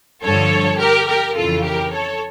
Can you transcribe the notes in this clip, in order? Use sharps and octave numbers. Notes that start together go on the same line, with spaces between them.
G2 D3 F3 A4 C#5
G4 A#4
G4 A#4
F2 C#3 E3 F4 A4
G4 A#4
A4 C#5